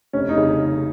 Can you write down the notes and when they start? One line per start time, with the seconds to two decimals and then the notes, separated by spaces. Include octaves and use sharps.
0.13 F1 C#4
0.29 D#4
0.37 C#3